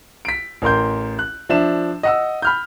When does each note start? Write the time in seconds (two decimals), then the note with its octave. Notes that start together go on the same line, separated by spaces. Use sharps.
0.25 B6 D7
0.62 A1 A#4 C6 G6
1.19 F#6
1.49 F3 D4 E5 E7
2.03 D#5 F#5 E6
2.42 B5 F6 G6